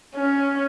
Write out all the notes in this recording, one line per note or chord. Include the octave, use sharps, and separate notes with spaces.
C#4